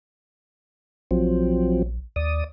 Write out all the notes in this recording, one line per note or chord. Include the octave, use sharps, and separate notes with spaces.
A#1 F3 F#3 C4
D#2 D5 D#6